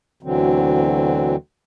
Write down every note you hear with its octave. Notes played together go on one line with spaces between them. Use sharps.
D2 B2 D3 E3 F#3 C4